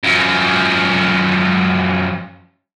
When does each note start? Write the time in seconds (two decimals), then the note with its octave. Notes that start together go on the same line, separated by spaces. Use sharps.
0.03 F#2 F3